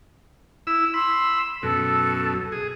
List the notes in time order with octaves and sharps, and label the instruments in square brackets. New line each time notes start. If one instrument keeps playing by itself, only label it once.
[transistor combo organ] E4 E6
[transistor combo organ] B5 E6 [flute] C6
[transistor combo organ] F#2 B2 [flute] A4
[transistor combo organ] G#4